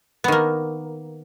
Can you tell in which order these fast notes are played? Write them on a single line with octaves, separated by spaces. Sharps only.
B3 D#3 A#3